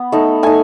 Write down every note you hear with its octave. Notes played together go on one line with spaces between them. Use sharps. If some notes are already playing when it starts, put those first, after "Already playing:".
Already playing: B3
A3 D#4
A3 D#4 G#5